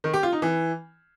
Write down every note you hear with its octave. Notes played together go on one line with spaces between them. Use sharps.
D#3
G4
F4
D#4
E3